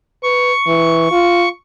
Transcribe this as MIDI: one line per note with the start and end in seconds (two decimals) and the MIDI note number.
0.23 0.52 71
0.23 1.49 85
0.67 1.07 52
1.12 1.47 65